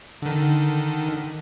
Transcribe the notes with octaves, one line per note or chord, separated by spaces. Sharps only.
D3 D#3